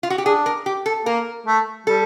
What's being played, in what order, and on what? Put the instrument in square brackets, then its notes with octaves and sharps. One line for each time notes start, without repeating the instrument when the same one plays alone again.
[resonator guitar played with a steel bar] F4
F#4
G4
[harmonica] D4 [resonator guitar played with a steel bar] G#4
[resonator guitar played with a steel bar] A#4
G4
A4
[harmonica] A#3 [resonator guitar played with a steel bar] A#4
[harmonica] A3
[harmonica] G3 [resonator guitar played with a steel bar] A4